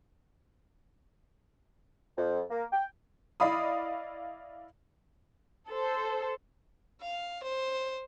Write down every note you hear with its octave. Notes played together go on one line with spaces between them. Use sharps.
F2
A#3
G5
E4 D5 D#5 F5 B5 D#6
A4 C5
F5
C5